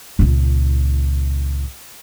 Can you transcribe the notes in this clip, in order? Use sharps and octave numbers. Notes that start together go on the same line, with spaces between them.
C#2 A#2